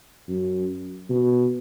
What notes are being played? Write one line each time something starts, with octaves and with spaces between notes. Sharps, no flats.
F#2
B2